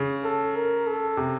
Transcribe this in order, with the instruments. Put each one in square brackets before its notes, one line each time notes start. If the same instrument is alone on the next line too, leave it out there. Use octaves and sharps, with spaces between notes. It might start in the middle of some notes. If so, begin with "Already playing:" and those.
Already playing: [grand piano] C#3
[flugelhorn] A4
A#4
A4
[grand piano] C3